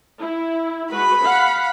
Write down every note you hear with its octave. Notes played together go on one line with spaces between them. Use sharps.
E4
G#3 F#4 B4 B5
F5 F#5